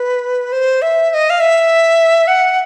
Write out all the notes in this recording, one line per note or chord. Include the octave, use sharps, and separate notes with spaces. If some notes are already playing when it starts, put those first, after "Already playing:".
Already playing: B4
C5
E5
E5
D#5
F5
E5
F#5